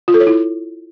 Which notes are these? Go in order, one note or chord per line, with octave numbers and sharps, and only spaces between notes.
F4
A4
C#5
E4